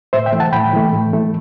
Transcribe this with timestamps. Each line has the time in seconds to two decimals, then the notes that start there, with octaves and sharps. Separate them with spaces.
0.13 A2 C5 E5
0.26 E5 G5
0.33 E3 A3
0.40 F#5 A5
0.53 A2 G5 B5
0.73 E3 A3
0.93 A2
1.13 E3 A3